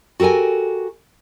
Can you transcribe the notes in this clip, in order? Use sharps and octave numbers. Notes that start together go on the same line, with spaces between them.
F#4 G4 A4 A#4 G#5